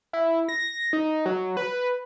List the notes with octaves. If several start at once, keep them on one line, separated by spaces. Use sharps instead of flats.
E4
A#6
D#4
F#3
B4